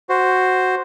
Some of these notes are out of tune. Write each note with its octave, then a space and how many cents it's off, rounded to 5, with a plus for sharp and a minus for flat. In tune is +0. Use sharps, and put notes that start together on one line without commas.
F#4 +0 C5 +0